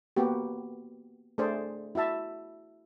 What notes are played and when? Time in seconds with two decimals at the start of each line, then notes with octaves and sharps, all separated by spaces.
0.16 A#3 B3 F#4 G4
1.38 A3 D4 G#4 C5 D5
1.95 E4 F#4 E5 A5